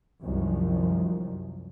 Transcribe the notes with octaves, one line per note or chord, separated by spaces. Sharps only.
C2 F#2 D#3 F3